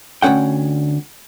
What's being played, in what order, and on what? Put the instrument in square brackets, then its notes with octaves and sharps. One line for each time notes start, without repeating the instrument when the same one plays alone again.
[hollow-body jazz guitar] D2 E3 C#4 F#5 G5